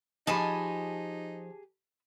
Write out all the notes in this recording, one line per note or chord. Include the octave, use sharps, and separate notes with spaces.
F3 D#4 G4 G#4 D#5 G#5 A5 B5